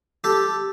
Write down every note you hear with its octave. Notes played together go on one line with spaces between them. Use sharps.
G4 A4